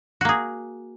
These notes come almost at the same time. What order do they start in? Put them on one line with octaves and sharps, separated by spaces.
F#4 A#3 G#4